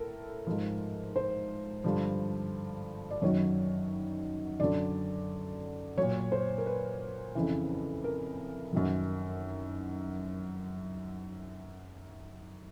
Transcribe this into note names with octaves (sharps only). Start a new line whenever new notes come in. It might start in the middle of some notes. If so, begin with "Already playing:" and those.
Already playing: A2 A4 A#4
G#2 F3
C5
G2 D3 F3
D5
F#2 D#3 F#3 C#5
F#2 D3 F#3 D5
A#2 F#3 C#5
C5
A#4
B4
F2 C#3 E3
A#4
F#2 D#3 F#3